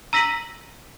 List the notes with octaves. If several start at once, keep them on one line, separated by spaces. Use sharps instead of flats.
A#5 E6 A#6 B6 D#7 F#7